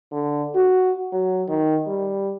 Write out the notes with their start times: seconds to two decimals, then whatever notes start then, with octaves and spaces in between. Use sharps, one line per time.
0.12 D3
0.55 F#4
1.12 F#3
1.48 D#3
1.87 G3